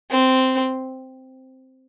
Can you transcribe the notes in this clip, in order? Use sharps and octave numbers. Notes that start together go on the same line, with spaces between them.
C4